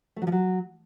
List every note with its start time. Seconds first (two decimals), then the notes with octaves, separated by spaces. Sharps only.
0.16 A3
0.22 F#3
0.27 F3
0.32 F#3